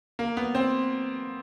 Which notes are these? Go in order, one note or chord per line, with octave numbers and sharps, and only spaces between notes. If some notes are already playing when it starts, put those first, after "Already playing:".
A#3
B3
C4